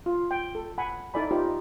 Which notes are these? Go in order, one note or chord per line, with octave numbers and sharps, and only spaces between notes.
F4
G5
A4
F#5 G#5 B5
D#4 E4 A4 D5 G#5 B5
D#4 F4 G4 C5